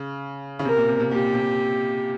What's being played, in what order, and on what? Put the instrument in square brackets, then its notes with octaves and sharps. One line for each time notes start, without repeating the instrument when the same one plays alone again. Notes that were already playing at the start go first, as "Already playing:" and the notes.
Already playing: [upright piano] C#3
C#3
[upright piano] C3 [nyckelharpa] A#4
[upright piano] A#2
C3
C3
[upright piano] A#2 [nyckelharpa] G4
[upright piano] C3